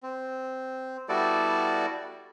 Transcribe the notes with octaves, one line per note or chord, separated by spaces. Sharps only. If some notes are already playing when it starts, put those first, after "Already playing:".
C4
G3 B3 E4 F#4 A4 D5